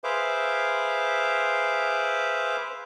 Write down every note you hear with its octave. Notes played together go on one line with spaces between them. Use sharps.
G#4 B4 C5 E5 F5 D6